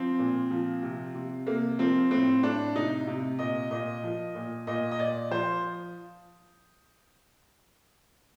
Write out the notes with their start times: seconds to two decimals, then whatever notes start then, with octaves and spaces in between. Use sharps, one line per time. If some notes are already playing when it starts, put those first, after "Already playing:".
Already playing: F3 C4
0.19 A#2
0.51 F3
0.83 C3
1.15 C3
1.47 C3 A#3
1.79 F3 C4
2.11 A2 C4
2.43 A2 D4
2.75 C3 D#4
3.07 C3
3.39 A#2 D#5
3.71 A#2 D#5
4.04 F3
4.35 A#2
4.67 A#2 D#5
4.91 D#5
4.99 A#2 D5
5.31 F3 C5